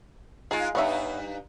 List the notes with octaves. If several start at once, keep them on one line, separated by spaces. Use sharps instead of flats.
G#3 D#4 F4 G#4
G2 B3 D#4 C#5 E5